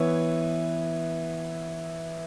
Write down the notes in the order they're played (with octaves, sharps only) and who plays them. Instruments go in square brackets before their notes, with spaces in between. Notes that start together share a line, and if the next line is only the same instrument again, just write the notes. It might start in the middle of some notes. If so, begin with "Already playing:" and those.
Already playing: [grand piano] E3 B3 E4 C#5